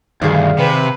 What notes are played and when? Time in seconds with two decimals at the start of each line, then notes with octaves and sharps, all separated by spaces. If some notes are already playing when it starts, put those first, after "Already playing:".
0.22 D2 G2 D#3 G#4 D5 F5
0.59 C3 B4